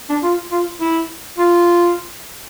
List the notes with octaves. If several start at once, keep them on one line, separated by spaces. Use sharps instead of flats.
D4
F4
F4
E4
F4